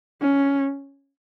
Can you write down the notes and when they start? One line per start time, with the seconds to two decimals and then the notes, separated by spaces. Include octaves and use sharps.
0.21 C#4